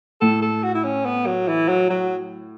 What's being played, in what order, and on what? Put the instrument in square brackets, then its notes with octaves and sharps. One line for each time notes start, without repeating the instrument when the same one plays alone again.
[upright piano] A2 [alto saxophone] A4
[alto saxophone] A4
F#4
E4
C#4
B3
F#3
E3
F#3
F#3